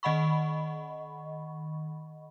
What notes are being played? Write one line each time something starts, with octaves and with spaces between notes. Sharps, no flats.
D#3 D#5 F#5 B5 C#6